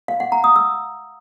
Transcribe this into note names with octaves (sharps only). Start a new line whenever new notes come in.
F5
F#5
A#5
D#6
E6